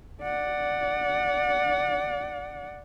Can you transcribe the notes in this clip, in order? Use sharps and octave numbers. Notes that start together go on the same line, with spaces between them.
D5 F#5